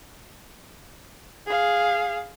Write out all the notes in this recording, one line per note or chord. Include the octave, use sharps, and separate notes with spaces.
G#4 F5